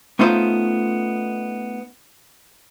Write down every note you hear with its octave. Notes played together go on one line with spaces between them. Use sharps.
A3 B3 C#4 D#4 F4 C5